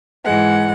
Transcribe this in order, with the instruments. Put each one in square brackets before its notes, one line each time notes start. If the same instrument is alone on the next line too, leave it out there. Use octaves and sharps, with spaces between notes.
[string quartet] G#2 E3 G#3 F#5